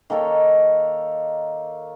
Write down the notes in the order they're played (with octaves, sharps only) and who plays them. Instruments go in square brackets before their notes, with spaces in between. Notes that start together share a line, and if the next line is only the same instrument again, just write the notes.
[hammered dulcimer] D#3 A#3 A4 C#5